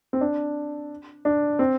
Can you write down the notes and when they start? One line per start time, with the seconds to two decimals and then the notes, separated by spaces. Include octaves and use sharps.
0.13 C4
0.21 D4
1.25 D4
1.59 C4